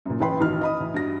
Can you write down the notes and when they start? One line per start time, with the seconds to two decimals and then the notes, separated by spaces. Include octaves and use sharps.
0.06 F#2 A#2
0.20 A1 C#4 B4 G5 B5 C6
0.40 A1 D#3 F#4 F6
0.61 D#5 B5 D#6
0.80 A2 E3
0.94 G2 F#4 A#6